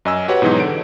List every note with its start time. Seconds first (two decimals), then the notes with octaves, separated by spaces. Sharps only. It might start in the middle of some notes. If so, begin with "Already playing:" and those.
0.05 F#2 D#5 G#5 E6
0.28 F#4 G4 B4 C#5 F#5
0.42 G#2 B2 E3 F#3 D#4
0.59 D3 D7